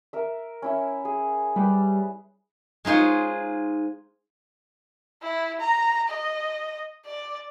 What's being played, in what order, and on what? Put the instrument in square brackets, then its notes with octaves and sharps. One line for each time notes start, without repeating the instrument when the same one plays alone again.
[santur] A#4 E5
C#4 E4 E5
G#4
[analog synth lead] G3 [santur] B4
[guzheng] G#3 D#4 F4 C5 C#5
[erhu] E4
A#5
D#5
D5